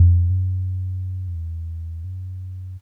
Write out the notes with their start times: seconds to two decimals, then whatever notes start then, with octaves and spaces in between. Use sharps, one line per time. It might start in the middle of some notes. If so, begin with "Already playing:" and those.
Already playing: F2
0.30 F#2
1.28 F2
1.35 E2
2.04 F#2